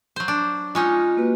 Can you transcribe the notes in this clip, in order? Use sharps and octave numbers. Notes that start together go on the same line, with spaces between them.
F#3 C5
D4
G#3 C#4 D#4 F4
A#3 F#4 B4